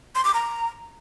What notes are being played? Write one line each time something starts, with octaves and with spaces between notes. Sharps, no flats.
C6
D6
A#5